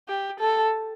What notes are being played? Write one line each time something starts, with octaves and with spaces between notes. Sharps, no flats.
G4
A4